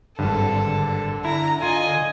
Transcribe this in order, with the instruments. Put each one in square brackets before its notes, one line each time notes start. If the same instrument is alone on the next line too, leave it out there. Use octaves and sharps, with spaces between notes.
[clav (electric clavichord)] G#1 G2 [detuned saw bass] D3 [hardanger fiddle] A4
[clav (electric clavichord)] E4 [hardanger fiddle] A#5
[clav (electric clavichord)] F4 [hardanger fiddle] D#5 G#5